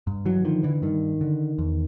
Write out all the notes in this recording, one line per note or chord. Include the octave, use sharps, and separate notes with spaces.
G2
E3 F#3
D3 D#3 F3
D3 E3
G2 D#3
D3
E2